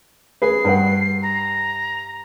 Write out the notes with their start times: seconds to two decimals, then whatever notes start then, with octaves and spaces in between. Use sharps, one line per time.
0.42 G#4 B4 C7
0.65 G2 B4 F#5
1.22 A#5